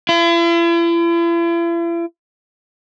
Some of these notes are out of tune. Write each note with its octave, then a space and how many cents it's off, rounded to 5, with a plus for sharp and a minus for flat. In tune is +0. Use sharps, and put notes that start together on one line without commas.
E4 +45